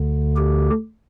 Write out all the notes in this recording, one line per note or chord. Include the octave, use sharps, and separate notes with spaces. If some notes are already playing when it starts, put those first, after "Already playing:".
Already playing: D2 D3
G4